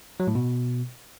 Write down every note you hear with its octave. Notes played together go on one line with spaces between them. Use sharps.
F#3
A2
B2